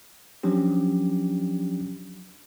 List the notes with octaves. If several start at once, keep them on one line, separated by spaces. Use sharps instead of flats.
F3 F#3 C#4 D4 G4